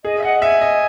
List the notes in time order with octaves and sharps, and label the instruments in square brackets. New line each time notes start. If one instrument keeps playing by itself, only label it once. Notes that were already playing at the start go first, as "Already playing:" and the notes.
[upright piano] G#4 [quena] D#5
[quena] E5
[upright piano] D#5 [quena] F#5
[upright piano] E5 [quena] G#5
[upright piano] D#5